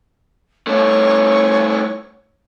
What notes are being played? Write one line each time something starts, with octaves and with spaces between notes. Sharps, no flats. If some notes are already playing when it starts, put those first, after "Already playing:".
G2 A3 C#5